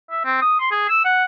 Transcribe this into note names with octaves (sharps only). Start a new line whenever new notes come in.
E5
C4
D#6
C6
G#4
E6
F#5